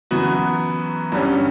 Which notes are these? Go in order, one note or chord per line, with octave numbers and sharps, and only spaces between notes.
F#2 E3 B3 F#4
G2 D3 G3 C#4